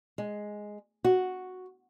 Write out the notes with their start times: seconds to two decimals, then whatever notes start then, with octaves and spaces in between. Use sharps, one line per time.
0.18 G#3
1.04 F#4